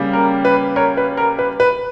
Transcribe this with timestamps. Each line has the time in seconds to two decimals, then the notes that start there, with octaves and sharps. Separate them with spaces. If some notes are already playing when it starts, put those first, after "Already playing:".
Already playing: C#3 G3 A#3
0.13 A#4
0.45 B4
0.76 A#4 C#5
0.97 B4
1.17 A#4
1.39 B4
1.60 B4